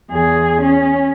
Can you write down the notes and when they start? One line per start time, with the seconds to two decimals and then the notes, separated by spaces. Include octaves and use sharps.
0.11 E2 G#4
0.62 C#4